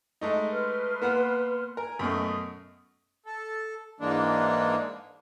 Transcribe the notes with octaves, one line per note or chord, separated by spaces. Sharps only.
G#3 A3 D#4
B4 C6 F6
A#3 B3 F#5
A#4 G#5
F#2 B2 A3 D#6
A4
G#2 E3 G#3 A#3 D4